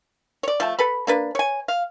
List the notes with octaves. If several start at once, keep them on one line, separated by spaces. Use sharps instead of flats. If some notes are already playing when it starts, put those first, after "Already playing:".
C#5 D5
F3 A3 A5
A4 B4 B5
A#3 D4 B4
C#5 G#5
F5